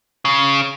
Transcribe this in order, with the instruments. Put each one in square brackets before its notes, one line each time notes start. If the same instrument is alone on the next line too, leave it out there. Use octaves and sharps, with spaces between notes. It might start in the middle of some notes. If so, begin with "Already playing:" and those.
[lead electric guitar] C#3